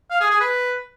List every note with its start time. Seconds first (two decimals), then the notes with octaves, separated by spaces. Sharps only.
0.10 F5
0.21 G#4
0.31 G#4
0.41 B4